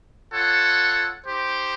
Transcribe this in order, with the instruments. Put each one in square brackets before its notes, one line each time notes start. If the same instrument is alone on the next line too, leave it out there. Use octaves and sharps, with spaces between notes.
[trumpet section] F4 A4 C#5 F#5
D#4 G4 C5